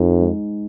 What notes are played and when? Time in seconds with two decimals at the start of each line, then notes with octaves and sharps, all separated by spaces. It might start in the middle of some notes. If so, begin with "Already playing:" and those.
Already playing: F2 D#4
0.22 G#3